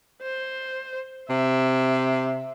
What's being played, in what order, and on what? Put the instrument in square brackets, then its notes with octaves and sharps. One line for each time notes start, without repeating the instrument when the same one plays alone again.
[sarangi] C5
[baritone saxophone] C3 [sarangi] E5